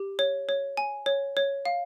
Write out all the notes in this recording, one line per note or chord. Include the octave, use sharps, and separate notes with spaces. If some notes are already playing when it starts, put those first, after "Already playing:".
Already playing: G4
C#5
C#5
G#5
C#5
C#5
F5